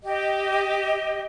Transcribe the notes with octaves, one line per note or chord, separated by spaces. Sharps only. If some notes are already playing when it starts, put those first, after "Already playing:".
G4 D#5